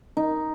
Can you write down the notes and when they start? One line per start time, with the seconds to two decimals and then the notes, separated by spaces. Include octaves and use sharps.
0.17 D#4